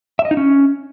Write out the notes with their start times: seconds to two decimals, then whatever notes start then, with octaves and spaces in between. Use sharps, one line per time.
0.19 E5
0.25 D#5
0.31 D#4
0.37 C#4